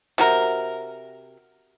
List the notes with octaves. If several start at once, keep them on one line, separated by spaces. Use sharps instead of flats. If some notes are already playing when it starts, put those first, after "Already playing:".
C3 F#4 A#4